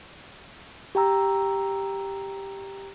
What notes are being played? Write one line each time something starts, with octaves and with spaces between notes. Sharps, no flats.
G4 G5 A#5 E6